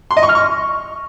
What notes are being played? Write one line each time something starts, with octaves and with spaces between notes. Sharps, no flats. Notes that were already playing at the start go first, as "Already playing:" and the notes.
C6
D#5
C#6
F6
C#6